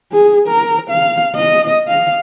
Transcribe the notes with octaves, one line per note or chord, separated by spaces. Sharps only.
G#4
A#4
F5
D#5
F5